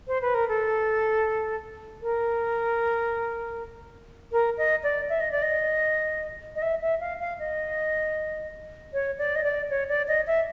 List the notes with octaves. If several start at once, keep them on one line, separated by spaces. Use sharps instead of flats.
C5
B4
A#4
A4
A#4
A#4
D#5
D5
E5
D#5
D5
D#5
D#5
E5
E5
F5
F5
D#5
C#5
D5
D#5
D5
C#5
D5
D#5
E5